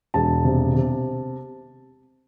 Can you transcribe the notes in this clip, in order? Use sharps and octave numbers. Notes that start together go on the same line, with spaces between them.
E1 A5
C3
C3